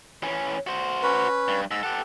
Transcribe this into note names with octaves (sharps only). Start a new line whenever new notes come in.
E3 C#4
F#4 C5
C#4 B4
G2
G#2 E6
G4 A4 F#5